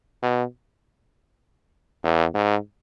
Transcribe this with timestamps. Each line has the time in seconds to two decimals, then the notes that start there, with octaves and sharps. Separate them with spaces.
0.22 B2
2.04 E2
2.34 G#2